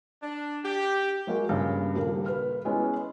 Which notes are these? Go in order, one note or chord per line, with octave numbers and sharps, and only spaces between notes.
D4
G4
F#3 G#3 A#3 F#4
G2 A#2 C#3
D#1 G3 A#3
B4 F6
G#3 B3 C#4 E4